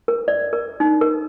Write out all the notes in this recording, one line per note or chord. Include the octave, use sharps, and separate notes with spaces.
A#4
D5
A#4
D#4
A#4